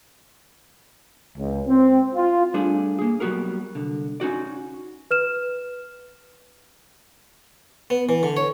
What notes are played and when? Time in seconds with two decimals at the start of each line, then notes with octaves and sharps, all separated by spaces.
1.38 C#2
1.67 C4
2.15 F4
2.54 G3 A3 D4 G#4
2.99 A#3 G#4
3.20 F#3 G3 B3 F#4 G#4 A#4
3.75 C2 D3
4.20 C#4 D#4 F#4 D5
5.11 B4 F6 E7
7.90 B3
8.09 E3
8.23 D3
8.37 C#5